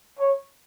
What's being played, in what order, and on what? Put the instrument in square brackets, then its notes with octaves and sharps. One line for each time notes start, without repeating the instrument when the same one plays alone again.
[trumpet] C#5